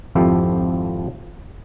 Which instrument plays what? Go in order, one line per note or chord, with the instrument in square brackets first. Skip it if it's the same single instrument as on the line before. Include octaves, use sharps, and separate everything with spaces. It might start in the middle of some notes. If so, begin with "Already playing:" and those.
[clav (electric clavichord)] G#1 F2 F3 E4 G4 A4